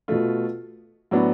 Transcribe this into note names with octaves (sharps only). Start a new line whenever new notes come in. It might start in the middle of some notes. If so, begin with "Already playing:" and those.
B2 A3 F4
A2 F#3 B3 D4